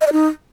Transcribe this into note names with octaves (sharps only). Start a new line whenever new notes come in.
D#5
D5
D#4